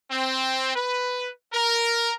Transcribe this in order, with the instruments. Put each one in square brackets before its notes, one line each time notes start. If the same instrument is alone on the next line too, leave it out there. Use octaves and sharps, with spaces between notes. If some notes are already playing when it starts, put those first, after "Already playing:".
[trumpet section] C4
B4
A#4